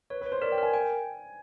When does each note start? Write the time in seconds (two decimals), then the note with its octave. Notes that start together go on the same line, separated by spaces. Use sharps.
0.10 B4 C#5
0.21 B4
0.26 C#5
0.32 C5
0.42 A#4 D5
0.52 G5
0.58 A#4 G#5
0.73 G5 G#5